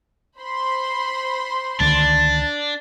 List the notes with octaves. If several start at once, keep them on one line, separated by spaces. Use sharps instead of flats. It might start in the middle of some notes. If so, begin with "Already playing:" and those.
C5 B5 C6
C#2 D3 D#3 D4 A5